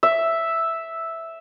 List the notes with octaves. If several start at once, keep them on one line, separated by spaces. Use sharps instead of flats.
E5